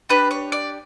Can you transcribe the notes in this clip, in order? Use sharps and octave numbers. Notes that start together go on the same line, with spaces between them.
D4 G4 B4
C#5
D5